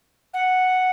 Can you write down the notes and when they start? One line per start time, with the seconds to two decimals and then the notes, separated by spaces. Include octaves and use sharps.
0.34 F#5